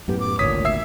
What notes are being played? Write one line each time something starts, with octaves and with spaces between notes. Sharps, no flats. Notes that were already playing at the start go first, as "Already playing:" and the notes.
F#2 A2 B3 G4
D6
G#1 D2 A#2 C#5 D#6 B6
E5 E6 C7